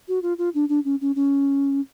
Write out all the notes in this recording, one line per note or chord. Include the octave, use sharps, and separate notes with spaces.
F#4
F4
F4
D4
D4
C#4
C#4
C#4